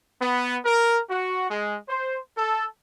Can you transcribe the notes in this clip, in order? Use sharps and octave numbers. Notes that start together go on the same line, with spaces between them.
B3
A#4
F#4
G#3
C5
A4